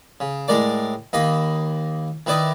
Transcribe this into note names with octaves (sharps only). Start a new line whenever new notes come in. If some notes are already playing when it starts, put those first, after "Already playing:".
C#3
A2 G#3 A#4 D5 D6
D#2 A#3 D#5 B5
D#3 E4 B4 D5 D#5